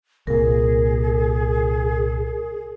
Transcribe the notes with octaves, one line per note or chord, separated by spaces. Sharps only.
C2 A#2 G#4 A#4